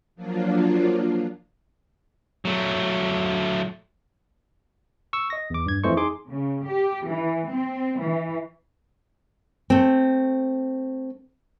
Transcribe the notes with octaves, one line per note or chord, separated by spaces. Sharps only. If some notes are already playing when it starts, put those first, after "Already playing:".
F3 F#3 A#3 D4 F4
F#3 A3
C#6 E6
D#5 A#6
E2 D6
G2 G#6
F2 E3 A3 C5 D#5 C#6
D#4 G#4 G#5 C6 D6
C#3
G4
E3
C4
E3
A3 C4